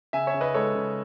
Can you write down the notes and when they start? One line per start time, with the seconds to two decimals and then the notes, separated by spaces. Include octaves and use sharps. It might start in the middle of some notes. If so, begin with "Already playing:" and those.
0.13 C#3 E5 G#5
0.27 C#5 E5
0.34 C#3
0.41 B4 D#5
0.54 G#3 A4 C#5
0.75 C#3